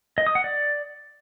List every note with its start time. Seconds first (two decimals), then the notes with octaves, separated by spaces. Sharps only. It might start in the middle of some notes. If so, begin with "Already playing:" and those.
0.18 D#5
0.27 D#6
0.35 F#5
0.44 D5